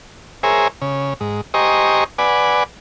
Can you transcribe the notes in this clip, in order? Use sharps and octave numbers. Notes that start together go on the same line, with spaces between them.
G#4 A#4 C5 C#5 E5 G#5
C#3
G#2
G4 C5 D#5 G#5 A#5 C#6
B4 D5 F#5 G#5